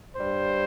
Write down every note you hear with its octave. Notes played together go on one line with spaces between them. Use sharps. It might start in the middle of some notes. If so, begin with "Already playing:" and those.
G2 G3 C5